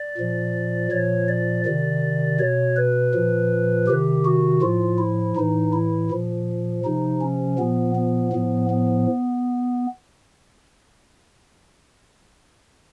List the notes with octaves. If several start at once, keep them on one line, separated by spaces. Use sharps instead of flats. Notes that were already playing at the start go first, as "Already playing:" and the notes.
Already playing: D5
A#2 F3
A#2 F3 C#5
D5
C3 D#3 D5
B2 C#5
B4
A#2 F3
C3 D#3 G4
F#4
A2 F3 F4
E4
A2 E3 D#4
E4
A#2 F3
C3 F3 D#4
C#4
A#2 F3 B3
B3
A2 F3 B3
B3